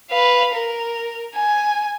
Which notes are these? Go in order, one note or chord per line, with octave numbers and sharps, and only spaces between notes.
B4 F5
A#4
G#5